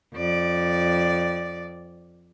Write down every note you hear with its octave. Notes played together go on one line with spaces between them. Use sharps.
F2 D5